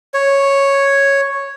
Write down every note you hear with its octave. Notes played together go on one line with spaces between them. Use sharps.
C#5